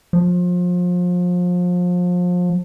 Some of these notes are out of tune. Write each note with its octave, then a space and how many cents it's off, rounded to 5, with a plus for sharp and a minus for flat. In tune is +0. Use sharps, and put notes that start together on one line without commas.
F3 +30